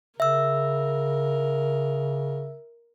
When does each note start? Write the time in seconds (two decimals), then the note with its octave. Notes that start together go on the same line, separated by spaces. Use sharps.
0.20 C#3 A#4 E5 E6